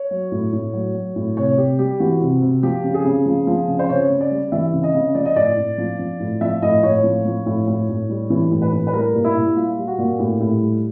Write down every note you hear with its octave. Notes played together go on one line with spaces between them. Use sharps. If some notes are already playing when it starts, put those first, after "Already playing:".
Already playing: C#5
F#3
A2
A2
F#3
F#3
A2
C3 C#5
C3 G4
G3 G4
E3 F#4
C3
C3
F3 G4
C#3
G#4
C#3
F3
F3
C#3
C5
C#3 C#5
C#3
D5
G3
E3 E5
C#3
D#5
C#3
F3 D5
D#5
A2 D5
A2
F3
F3
A2
F3 E5
A2 D#5
A2 C#5
F3
F3
A2
A2
A2
G3
E3
A2
B4
A2
B4
G3 A#4
A#2
E4
A#2
G3 F4
G3
F#4
A#2
A2 G4
A2
G3